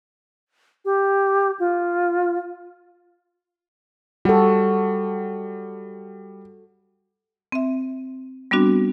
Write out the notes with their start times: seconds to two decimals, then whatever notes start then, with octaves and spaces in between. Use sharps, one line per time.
0.85 G4
1.60 F4
4.25 G3 F#4 A4
7.52 C4 E5
8.51 G3 B3 C4 D4 F#4